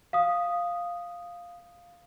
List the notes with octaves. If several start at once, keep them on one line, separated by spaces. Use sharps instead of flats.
F5 D#6